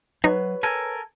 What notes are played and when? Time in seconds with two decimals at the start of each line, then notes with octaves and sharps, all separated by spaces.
0.24 F#3 D#4 B4 C#5
0.63 A4 A#4 G#5